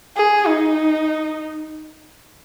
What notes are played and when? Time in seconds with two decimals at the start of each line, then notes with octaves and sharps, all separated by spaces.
0.17 G#4
0.47 D#4